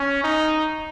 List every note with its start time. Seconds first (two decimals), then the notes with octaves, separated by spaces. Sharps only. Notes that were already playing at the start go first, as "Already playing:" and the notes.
Already playing: C#4
0.24 D#4